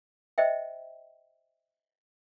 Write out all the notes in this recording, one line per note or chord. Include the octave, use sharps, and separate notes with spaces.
C5 D#5 E5 G5